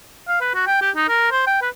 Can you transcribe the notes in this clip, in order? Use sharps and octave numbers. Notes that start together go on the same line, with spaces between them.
F5
B4
F#4
G5
G4
D#4
A#4
C5
G5
B4